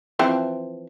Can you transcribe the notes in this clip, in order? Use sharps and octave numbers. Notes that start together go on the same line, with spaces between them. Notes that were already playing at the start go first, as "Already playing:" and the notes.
E3 F3 C4